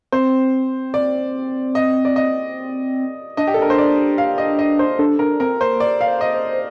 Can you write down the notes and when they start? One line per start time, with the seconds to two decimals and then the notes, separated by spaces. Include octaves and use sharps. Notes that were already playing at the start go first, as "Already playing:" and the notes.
0.12 C4 C5
0.94 D5
1.75 D#5
2.05 D5
2.16 D#5
3.37 D4 D#5
3.47 G4
3.54 A4
3.62 A#4
3.70 C5
3.78 D5
4.18 F5
4.38 D#5
4.59 D#5
4.79 C5
4.99 D4 A4
5.19 D4 A#4
5.40 C4 A#4
5.61 A#3 C5
5.80 D5
6.01 F5
6.08 C5
6.21 D#5
6.34 C5